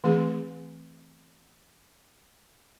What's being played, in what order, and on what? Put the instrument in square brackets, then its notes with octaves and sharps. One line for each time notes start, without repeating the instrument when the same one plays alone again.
[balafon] E3 A3 C4 G#4